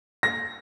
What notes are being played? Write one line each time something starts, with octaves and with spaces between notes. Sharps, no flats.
A#6